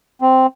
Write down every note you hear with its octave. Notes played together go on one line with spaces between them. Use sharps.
C4